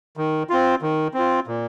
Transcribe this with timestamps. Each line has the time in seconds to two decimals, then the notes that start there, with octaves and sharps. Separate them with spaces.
0.17 D#3
0.50 C4 F4
0.82 D#3
1.14 C4 F4
1.48 A#2